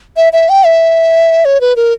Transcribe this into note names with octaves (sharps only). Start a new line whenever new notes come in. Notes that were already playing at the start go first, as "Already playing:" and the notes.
E5
E5
G5
E5
C#5
B4
A#4